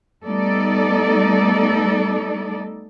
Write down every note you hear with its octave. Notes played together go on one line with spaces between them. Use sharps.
G3 A3 B3 D#4 A4 D5